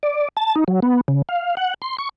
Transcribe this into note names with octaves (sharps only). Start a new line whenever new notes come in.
D5
A5
D#4
F#3
B3
C#3
F5
F#5
C6
C#6